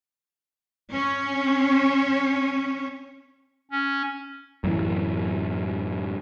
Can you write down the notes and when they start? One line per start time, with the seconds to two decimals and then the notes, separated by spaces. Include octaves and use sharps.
0.92 C#4 C#5
3.71 C#4
4.64 F#2 A2 E3